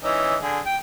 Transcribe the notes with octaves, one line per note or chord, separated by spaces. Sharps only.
E3 C#4 D#4
D3 G#4
G5